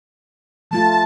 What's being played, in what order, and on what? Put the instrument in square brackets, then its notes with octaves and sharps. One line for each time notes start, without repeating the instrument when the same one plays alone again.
[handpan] F3 A3 F4 [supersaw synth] A5